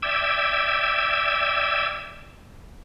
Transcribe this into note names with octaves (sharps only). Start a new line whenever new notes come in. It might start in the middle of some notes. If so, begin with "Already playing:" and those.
D5 E5 G5 E6 G#6